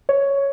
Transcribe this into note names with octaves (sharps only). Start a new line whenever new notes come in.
C#5